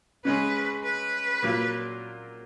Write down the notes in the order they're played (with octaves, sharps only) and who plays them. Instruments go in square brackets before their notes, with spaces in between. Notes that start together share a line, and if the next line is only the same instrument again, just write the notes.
[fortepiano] C#3 G#3 C#4 G#4 [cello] B4
[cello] B4
[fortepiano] A#2 F#3 A#3 F4